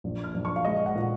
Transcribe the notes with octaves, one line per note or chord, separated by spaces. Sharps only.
A#1
F6
A#1
C#6
F5
G#3 D#5
F#5
A#2